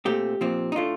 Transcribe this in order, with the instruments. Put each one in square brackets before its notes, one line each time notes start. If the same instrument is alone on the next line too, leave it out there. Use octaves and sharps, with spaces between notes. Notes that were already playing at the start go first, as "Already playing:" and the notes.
[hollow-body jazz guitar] A#2 A3 C4 G4
A#2 F3 C4
D#4
A2 A3 D4 F4